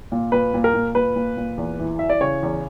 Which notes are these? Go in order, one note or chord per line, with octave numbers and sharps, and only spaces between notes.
A#2
A#2 B4
A#2
A#4
A#2
A#2 B4
A#2
A#2
E2
E3
E3 E5
D5
C#3 C#5
E2